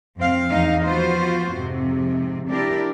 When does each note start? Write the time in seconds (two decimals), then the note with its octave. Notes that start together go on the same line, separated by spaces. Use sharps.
0.17 F2 C4 F5
0.51 E2 E3 D#4 F5
0.86 F3 B3 F4 F#4 C5
1.54 F2 G#2 C3
2.49 D4 E4 G4 A#4 D5